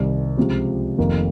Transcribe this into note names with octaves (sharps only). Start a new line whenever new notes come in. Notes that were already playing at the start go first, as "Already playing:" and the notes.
Already playing: C2 C3 D#3 G3
C#2 C3 F3
F1 F2 D#3 A#3